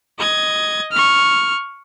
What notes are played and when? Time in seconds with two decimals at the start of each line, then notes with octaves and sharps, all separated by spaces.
0.19 D#5 G#6
0.92 C#6 F6